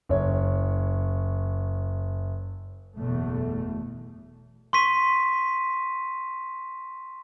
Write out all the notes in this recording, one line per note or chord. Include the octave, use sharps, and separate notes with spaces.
F#1 C#5
F#1 E2 B2 A3
C6 C#6 B6 D#7